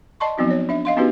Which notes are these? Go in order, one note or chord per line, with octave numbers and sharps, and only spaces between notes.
D5 D#5 A5 C6 C#6
F3 F#3 B3 C4 D#4 F#4
C#5
D4 E5
D#5 F5 C6
B3 C#4 D#4 F#4 G4 B4